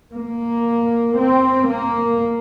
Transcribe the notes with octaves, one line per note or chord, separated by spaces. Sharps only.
A#3
C4
A#3